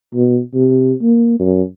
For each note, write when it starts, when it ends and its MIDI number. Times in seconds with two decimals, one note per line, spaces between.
0.14 0.39 47
0.54 0.93 48
1.02 1.36 58
1.39 1.62 42